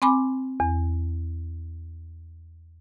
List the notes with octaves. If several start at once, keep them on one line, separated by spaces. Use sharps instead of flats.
C4 G#5 B5 D6
E2